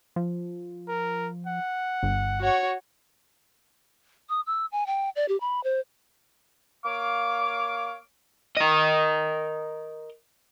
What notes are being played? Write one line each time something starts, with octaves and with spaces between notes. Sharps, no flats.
F3
A#4
F#5
G1
F#4 C#5
D#6
E6
G#5
G5
D5
G4
B5
C5
A#3 C#5 F5 D6
A#4 D#5